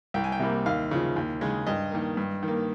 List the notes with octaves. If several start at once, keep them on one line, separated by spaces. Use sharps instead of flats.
C2 G5
G#5
G5
C3 G3 A#3
D#2 F5
C#3 F3
D#2
C#3 G#3
G2 D#5
D#3 A#3
G2
D#3 A#3